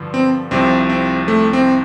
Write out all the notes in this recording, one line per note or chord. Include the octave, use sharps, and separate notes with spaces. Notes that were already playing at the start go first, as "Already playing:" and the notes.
Already playing: G2 D3 F3
C4
C2 C3 F3 C4
C4
A3
C4